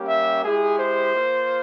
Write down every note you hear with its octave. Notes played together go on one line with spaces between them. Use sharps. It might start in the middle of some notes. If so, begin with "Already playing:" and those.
Already playing: G3 A#3 C#4 G4
E5
G#3 E4 G4 G#4
C5
A#3 F4